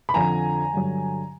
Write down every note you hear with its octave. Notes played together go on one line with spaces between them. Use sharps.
B5
F2 D3 F3 G#5 A#5
G2 D3 F#3